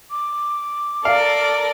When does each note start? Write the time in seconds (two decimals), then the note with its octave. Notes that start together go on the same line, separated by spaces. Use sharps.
0.11 D6
1.05 A4 A#4 D5 F5